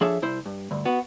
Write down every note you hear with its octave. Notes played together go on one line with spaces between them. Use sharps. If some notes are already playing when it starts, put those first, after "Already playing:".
F3 D4 G#4 A4 C#5 E5
C2 E4 C5
G2
D2 G2
B3 F#4